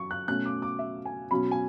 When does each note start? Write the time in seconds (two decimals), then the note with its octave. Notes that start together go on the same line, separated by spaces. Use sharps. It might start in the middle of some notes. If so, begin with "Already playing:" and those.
Already playing: F#2 C#6
0.11 F#6
0.28 B2 F#3 A3 C#4 F#6
0.46 D6
0.62 D6
0.79 E5
1.05 G#5
1.31 B2 F#3 C#4 B5
1.51 G#5